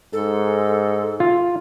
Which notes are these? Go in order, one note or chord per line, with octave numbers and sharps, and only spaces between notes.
G#2 A4
F4